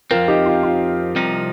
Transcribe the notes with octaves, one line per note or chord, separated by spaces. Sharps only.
F2 F3 C4 F4 A#4
D#4 G4
F4
F4
C2 C3 F3 D#4